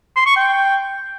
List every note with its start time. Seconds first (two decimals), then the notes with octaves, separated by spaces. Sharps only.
0.16 C6
0.26 C#6
0.37 G5